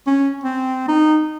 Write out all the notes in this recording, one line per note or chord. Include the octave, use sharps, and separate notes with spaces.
C#4
C4
D#4